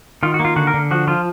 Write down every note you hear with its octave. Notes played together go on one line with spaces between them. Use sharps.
D#3 F4
F#4
A#3
F4
D3 F#4
A#4
D3
F3 F#4
F3 F4